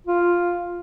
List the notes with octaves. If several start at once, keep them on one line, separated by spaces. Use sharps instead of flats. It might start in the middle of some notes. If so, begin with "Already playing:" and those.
F4